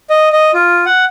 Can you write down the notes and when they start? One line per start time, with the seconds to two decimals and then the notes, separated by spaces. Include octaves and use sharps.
0.10 D#5
0.32 D#5
0.54 F4
0.86 F#5